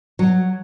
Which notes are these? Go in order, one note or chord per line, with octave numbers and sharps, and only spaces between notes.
F#3